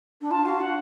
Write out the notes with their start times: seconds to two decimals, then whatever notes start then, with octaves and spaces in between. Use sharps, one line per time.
0.21 D4
0.30 F4 A5
0.45 F#4 F5
0.60 D4 F#5